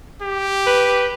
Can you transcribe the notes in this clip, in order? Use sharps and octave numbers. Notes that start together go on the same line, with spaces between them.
G4
B4